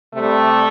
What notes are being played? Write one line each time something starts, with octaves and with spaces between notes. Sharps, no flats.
C3 G3 A3